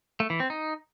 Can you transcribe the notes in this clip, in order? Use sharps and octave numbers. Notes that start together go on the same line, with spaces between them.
A3
E3
C4
D#4